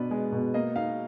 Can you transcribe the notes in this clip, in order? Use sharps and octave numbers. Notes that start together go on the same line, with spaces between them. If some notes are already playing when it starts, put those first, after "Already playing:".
Already playing: B2 D4 B4
G#3
B2
A#3 D#5
D#4 F5